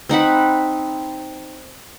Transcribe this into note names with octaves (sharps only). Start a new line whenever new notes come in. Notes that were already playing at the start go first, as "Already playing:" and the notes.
C4 D#4 F#5 B5